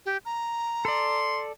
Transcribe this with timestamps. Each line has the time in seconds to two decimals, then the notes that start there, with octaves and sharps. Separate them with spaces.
0.06 G4
0.25 A#5
0.85 A4 D5 C6